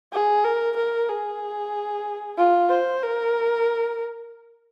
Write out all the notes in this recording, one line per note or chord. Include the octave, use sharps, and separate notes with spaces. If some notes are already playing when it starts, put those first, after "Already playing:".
G#4
A#4
A#4
G#4
F4
C5
A#4